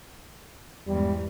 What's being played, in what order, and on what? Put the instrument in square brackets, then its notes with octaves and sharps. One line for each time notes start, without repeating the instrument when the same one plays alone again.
[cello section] E2 G#2 [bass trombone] G3